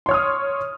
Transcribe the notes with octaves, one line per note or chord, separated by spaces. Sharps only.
C#5 C6 D#6 F6